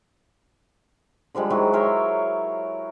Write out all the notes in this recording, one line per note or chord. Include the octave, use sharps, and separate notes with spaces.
D3 F3 G3 G#3
D#3 F#3 G#3 E4
A#4 C#5 E5 C6